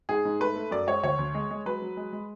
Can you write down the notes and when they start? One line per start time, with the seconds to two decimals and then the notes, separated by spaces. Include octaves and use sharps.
0.09 G#2 G#4
0.25 G#2
0.40 A3 B4
0.56 A3
0.71 F#2 D5
0.87 G#3 C#5
1.03 D2 C#5
1.18 D2
1.35 G#3
1.51 G#3
1.66 F#3 B4
1.82 F#3
1.97 G#3
2.13 G#3